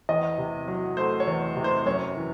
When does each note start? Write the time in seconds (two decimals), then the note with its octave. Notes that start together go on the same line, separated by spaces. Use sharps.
0.09 E2 D#5
0.38 C3
0.68 F#3
0.97 A3 C5
1.20 C#5
1.27 E2
1.56 C3
1.64 C5
1.86 F#2 C#5
2.16 E3